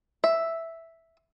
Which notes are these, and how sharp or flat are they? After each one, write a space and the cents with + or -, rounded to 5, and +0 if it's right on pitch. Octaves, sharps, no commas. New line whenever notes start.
E5 +0